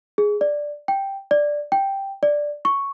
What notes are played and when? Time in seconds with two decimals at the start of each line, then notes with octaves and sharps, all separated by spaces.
0.18 G#4
0.41 D5
0.88 G5
1.31 D5
1.72 G5
2.23 D5
2.65 C#6